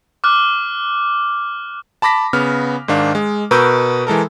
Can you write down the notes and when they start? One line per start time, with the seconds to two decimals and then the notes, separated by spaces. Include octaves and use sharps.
0.24 D6 F6 F#6
2.02 A5 B5 D6 A#6 B6
2.33 C#3 B3 F6
2.88 G#2 D#3 D4 F5
3.15 G#3
3.51 B2 A#4 B4 C#6 E6 G6
4.07 E3 G#3 A4 A#4